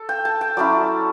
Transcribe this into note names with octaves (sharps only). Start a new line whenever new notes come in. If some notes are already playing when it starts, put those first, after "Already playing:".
Already playing: A4
G5
A5
G5
F#3 C#4 E4 D5